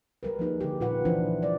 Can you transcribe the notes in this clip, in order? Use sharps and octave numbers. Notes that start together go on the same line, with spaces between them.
G3 A#4 B4
F3 A#3 D#4 G#4
D3 G4
A#2 F4 B4 F#5
E3 F3 D4 E4 C5
G3 C5 D5